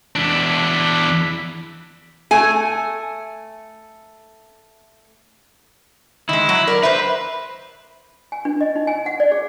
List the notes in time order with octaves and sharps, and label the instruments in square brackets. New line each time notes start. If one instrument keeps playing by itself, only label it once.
[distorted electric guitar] E2 D4 [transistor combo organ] E3 B5
[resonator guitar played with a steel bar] A3 G#5
[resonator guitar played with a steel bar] D#3 G#3 [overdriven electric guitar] E4
[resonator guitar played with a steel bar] F#3
A#4 D5
[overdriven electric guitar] B4 [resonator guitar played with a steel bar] C5 E5
[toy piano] G#5
D4
D#5
D#4
G#5
F#5
D5
G#4